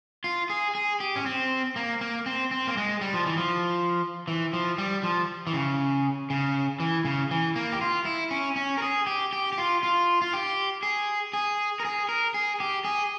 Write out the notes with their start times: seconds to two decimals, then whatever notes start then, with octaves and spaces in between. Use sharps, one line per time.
0.24 F4
0.50 G#4
0.75 G#4
1.00 G4
1.16 C#4
1.26 C4
1.76 A#3
2.01 A#3
2.26 C4
2.51 C4
2.67 A#3
2.77 G#3
3.01 G3
3.13 F3
3.26 E3
3.37 F3
4.28 E3
4.53 F3
4.78 G3
5.03 F3
5.47 E3
5.54 C#3
6.30 C#3
6.80 E3
7.05 C#3
7.31 E3
7.56 A#3
7.72 G4
7.81 F4
8.05 E4
8.31 C#4
8.56 C#4
8.78 A#4
8.82 G#4
9.07 G4
9.33 G4
9.53 G4
9.58 F4
9.83 F4
10.22 F4
10.33 G4
10.83 G#4
11.33 G#4
11.80 A#4
11.85 G#4
12.09 A#4
12.34 G#4
12.60 G4
12.84 G#4